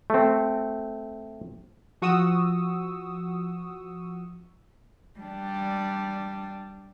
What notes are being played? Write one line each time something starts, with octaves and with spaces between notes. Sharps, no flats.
A3 C4
F3 F#4 C#6 D#6 E6
G3 D4